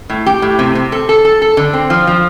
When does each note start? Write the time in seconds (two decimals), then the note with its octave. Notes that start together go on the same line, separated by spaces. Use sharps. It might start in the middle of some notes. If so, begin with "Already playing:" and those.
0.10 A2
0.26 G4
0.42 A2
0.59 C3
0.75 C3
0.92 A4
1.09 A4
1.25 A4
1.42 A4
1.57 D3
1.73 C4
1.90 F3
2.07 F3